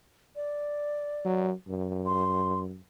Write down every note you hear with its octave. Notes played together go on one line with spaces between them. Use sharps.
D5
F#3
F#2
C6